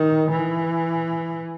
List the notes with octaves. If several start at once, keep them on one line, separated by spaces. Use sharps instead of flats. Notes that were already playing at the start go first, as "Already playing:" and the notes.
Already playing: D#3
E3